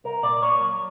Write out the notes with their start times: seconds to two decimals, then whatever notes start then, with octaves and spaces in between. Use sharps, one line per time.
0.04 C2 A#4
0.23 A#2 D5
0.42 A#3 C#5
0.61 F#3